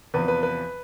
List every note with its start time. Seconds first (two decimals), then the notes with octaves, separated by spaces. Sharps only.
0.14 E2 C3 F3 B4
0.28 B4
0.43 B4